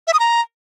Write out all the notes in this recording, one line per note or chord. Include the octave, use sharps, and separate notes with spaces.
E5
D#6
A#5